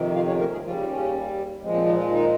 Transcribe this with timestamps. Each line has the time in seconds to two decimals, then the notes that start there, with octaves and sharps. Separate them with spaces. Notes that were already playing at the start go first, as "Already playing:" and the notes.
Already playing: F2 C3 D#3
0.15 F4 F5
0.27 C#4 C#5
0.40 A#3 A#4
0.52 G#3 G#4
0.64 D#2 C#3 F3 G3 F4
0.89 C#3 C#4
1.62 A#2 F3 G#3 C4
1.74 C4
1.86 D#3 D#4
1.98 F3 F4
2.11 D#3 D#4